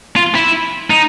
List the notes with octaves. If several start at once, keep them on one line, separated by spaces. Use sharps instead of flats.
F4
E4
D#4